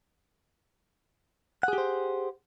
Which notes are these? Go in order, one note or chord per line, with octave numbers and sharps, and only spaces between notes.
G4 G#4 C5 F#5